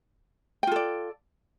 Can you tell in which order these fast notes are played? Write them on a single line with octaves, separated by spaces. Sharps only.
G5 F4 A4 D5